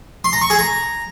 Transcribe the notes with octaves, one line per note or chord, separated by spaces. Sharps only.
C6
A#5
C#6
G#4
A#5